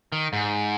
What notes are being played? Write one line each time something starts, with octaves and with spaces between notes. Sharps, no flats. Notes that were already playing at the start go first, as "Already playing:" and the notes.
D#3
G#2